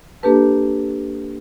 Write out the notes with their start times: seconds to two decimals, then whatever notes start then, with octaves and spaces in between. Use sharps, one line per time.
0.23 A#3 D4 G4 A4 B4 A5